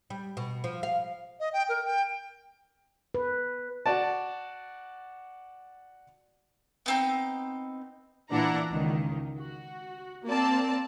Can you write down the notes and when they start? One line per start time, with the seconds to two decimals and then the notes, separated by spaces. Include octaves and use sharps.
0.10 G3
0.37 B2
0.64 F3
0.83 F5
1.40 D#5
1.53 G5
1.69 A#4
1.85 G5
3.14 B4
3.86 F#4 D5 A5
6.86 B3 C4 D#4
8.31 A#2 E3 D4 E4 F#5 A#5
8.71 C#2 D#3
9.37 F#4
10.25 A#3 C4 D5 A5